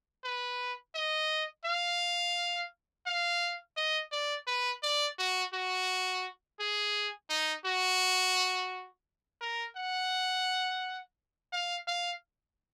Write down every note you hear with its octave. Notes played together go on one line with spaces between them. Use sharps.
B4
D#5
F5
F5
D#5
D5
B4
D5
F#4
F#4
G#4
D#4
F#4
A#4
F#5
F5
F5